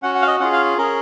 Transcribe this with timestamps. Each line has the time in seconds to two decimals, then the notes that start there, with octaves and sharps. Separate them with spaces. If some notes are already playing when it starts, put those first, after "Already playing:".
0.03 C#4 F#4 F#5
0.15 F#5
0.22 F5
0.27 D#5
0.40 C#4 F4 G#4 F#5
0.53 F5
0.78 C#4 G#4 A#4